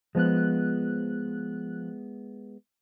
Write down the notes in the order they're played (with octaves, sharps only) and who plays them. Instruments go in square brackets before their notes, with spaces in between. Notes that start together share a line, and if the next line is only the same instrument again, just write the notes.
[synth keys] F3 F#6 [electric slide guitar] G#3 B3